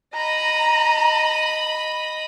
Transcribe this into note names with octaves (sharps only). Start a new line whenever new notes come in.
D#5 A#5 B5